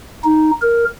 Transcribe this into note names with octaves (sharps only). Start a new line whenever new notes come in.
D#4
A#4